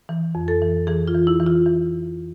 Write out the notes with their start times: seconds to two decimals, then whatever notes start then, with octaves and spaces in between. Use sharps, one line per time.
0.09 E3
0.35 F2
0.48 A4
0.62 E3
0.87 E3 G#4
1.08 F4
1.14 E3
1.27 E4
1.40 E3
1.46 F4
1.66 E3